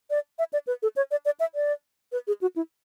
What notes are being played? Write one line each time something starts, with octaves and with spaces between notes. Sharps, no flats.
D5
E5
D5
B4
A4
C#5
D5
D5
E5
D5
B4
G#4
F#4
E4